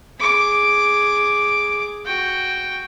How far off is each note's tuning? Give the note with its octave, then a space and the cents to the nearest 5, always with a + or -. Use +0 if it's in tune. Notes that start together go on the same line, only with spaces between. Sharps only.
G#4 +0 D6 +0
F#4 +5 G5 +0